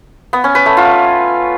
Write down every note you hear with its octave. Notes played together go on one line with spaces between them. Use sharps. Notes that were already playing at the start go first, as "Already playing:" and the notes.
B3
C#4
B4
A3
F4